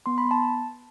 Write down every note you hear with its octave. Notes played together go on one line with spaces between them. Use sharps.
B3 C6
B5
B3
A5